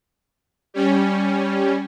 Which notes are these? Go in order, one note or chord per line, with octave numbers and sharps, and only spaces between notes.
G3 C#4